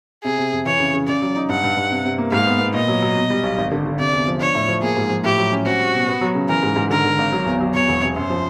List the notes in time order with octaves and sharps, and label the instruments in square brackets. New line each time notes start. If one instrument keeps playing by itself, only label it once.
[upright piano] C3 [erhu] G#4
[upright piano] C3
F2
[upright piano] E3 [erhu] C#5
[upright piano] C#3
C#3
[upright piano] C#3 [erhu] D5
[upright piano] F#3
D#4
[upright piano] G2 [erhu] F#5
[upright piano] G2
G2
C3
C3
A#3
[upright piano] G#2 [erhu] F5
[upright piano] B3
B3
[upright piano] A#2 [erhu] D#5
[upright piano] F#3
F#3
B2
G3
B1
G#1
D3
D3
[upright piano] C3 [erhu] D5
[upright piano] E2
F3
[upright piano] D4 [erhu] C#5
[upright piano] A2
F3
[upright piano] A#3 [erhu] G#4
[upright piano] G#2
F3
[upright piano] A2 [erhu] G4
[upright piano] F#3
C#4
[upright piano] C4 [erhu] F#4
[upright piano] G3
B2
B3
F#3
C#3
[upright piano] E3 [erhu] A#4
[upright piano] G#2
G#2
[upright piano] D3 [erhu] A#4
[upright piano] D3
G#1
F#3
E2
F#3
[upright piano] E2 [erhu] C#5
[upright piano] E1
C3
[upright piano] F#2 [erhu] C5
[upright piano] F3